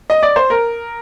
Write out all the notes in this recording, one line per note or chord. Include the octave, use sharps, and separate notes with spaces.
D#5
D5
C5
A#4